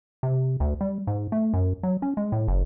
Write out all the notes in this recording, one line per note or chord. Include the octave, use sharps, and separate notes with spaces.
C3
D2
G3
G#2
A3
F#2
F#3
C#4
G#3
A2
F#1